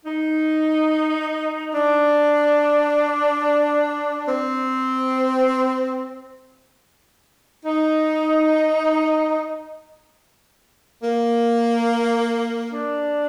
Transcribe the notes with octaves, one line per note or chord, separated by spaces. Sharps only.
D#4
D4
C4
D#4
A#3
D4